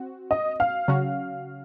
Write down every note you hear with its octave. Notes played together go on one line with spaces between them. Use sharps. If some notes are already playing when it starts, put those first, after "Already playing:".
Already playing: C4 F#4
D#5
F5
C#3 F#3 C#4 F#4